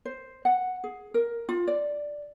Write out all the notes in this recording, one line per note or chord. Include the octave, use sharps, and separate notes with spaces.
C5
F#5
G#4
A#4
F4
D5